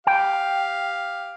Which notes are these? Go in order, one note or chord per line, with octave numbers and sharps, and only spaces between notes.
G4 F5 G5